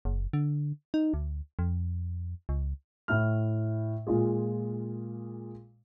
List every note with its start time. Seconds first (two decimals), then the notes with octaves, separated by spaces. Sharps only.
0.05 F#1
0.33 D3
0.94 D#4
1.14 D2
1.59 F2
2.49 C#2
3.08 A2 E4 F6
4.07 A#2 G#3 F4 G#4